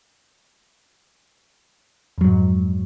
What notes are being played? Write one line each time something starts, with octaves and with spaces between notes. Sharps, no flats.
F2 G#2 F#3